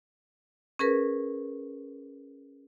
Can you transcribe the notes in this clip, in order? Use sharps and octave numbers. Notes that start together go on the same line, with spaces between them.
C#4 G#4 A#4 B4